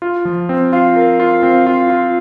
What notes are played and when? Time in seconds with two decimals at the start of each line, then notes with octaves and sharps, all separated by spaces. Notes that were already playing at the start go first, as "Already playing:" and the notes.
0.02 F4
0.25 F3
0.49 C4
0.72 F4 F5
0.96 A#4
1.20 F4
1.43 C4
1.66 F4
1.90 F4